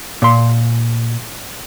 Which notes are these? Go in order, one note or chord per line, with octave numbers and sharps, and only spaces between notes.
A#2 C6